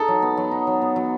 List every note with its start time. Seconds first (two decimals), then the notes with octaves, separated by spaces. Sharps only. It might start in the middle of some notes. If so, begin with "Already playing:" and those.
Already playing: D#4 A4
0.08 F#3
0.22 B3
0.37 F#3
0.51 D#4
0.67 F#3
0.82 B3
0.96 F#3